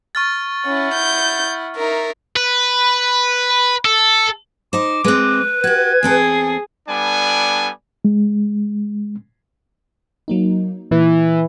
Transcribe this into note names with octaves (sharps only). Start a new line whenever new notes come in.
C#6 F6 A6
C#4 E4 F#5
G6
D#4 A#4 E5
B4
A4
D#4 C5 D6
G#3 C4 B4
F#4 G4 G#6
E2 C4 G#4 A4
G3 B3 D4 A4 D5 G#5
G#3
F#3 A#3 D#4
A#2 E3